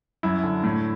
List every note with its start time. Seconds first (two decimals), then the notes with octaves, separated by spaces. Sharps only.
0.23 F#2 E4
0.44 D3
0.64 A2